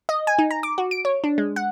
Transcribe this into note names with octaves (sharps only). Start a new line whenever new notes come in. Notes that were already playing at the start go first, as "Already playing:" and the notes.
D#5
G#5
D#4
A#5
D6
F#4
D7
C#5
D4
G#3
F#5